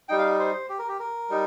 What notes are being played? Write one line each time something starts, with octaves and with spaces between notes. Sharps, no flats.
G3 D#4 G5
F5
C5
G4
A#4
G4
A#4
G3 D#4